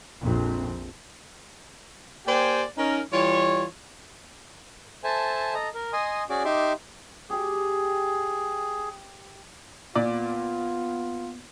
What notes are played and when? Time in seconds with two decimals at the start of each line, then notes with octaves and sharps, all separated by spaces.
0.20 A#1 F2 C4
2.27 A#3 G4 C5 D5 G5 G#5
2.77 C#4 D#4 A#4
3.13 E3 G3 F4 C#5
5.04 A4 C5 E5 G#5 A5
5.54 A4 D#5 A#5
5.74 A#4
5.93 D#5 G#5 C6 D#6
6.30 C#4 F#4 G#4 D5 D6
6.45 D#4 G4 E5 C6 D6
7.30 G4 G#4 G5
9.95 A#2 B3 F4 D5